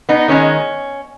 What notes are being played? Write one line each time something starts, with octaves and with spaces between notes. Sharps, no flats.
B3 D#4
D#3 G#3 C#4